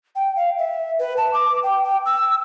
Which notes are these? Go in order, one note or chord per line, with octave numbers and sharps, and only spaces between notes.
G5
F5
E5
B4
A5
D6
G5
G5
E6